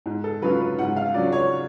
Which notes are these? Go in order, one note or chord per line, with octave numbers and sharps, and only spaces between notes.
G#2
A4
F#3 C#4 F4 B4
B4
G#2 F#5
F5
F#3 C#4 F4 D5
C#5